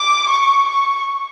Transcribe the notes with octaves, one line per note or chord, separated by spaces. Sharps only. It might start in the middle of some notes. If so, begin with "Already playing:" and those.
Already playing: D6
C#6
C#6